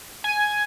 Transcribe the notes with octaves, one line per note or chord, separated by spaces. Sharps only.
G#5